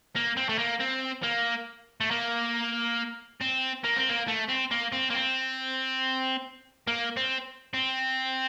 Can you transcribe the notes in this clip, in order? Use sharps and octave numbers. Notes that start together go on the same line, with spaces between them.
A#3
C4
A3
A#3
C4
A#3
A3
A#3
C4
A#3
C4
A#3
A3
C4
A#3
C4
A#3
C4
A#3
C4
C4